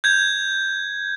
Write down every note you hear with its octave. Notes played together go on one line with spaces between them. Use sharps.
G6 G#6